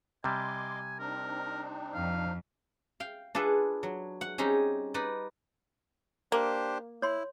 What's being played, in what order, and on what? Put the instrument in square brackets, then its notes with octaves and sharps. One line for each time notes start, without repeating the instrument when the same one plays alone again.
[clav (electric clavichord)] C3 G3 [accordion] D#5 C6 D6 [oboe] G#5
[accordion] C4 D4 D#4 [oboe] A#4
[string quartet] F2 [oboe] F5
[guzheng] F5 G5
D4 F4 G#4 A4 B4
F#3
F#5
G3 C4 C#4 D#4 G4 G#4
D#4 B4 D5
[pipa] A#3 [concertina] D4 G4 C5
[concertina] E4 [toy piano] C#5 C6